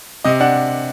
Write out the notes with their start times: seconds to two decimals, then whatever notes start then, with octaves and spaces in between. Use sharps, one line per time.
0.24 C3 D#5
0.40 D4 F#5